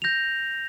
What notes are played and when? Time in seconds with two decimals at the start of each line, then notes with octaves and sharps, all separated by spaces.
0.02 G6 A#6 F7